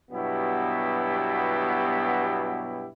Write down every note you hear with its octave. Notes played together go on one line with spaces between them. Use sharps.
G2 B2 F#3 B3 E4 G4